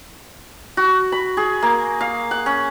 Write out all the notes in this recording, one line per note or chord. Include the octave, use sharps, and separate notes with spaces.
F#4
B5
G#4
A#3
F5
F#5
C#4